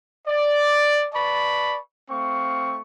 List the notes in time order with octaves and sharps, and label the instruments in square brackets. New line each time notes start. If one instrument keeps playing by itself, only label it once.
[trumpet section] D5
B4 D5 A5 B5 C#6
A3 C4 F5 C#6